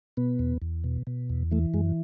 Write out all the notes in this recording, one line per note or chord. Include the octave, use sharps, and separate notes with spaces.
B2 B3
E2
E2
B2
B2
E2
E3 A3
F#2 G#3